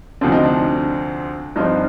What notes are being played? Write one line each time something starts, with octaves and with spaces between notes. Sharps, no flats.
D2 C3 F3 C4 D4
D#4
D4
G2 F3 C4 D#4